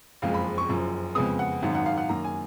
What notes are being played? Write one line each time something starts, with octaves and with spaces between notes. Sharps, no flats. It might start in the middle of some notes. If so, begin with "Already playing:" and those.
F#1 F2 F3 G#3 F5
B5
C#6
F#1 F#2 F3
F2 C#3 G#3 B3 D#6
F#5
G#1 F#2 D#3 F#5
F#5
F5
F#5
F#2 D#3 A#3 A#5
G#5